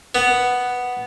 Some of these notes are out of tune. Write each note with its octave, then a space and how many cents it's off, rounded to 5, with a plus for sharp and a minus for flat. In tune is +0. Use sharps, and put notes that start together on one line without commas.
B3 +0